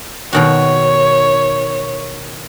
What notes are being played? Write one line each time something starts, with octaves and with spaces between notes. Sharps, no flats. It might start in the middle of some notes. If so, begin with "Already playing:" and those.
B2 D#3 F#4 C#5